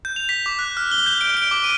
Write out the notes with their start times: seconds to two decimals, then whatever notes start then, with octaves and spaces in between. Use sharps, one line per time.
0.05 G6
0.16 F7
0.29 B6
0.46 D6
0.59 F#6
0.77 F6
0.91 G7
1.06 G6
1.21 D7
1.37 D7
1.51 D6
1.64 D#7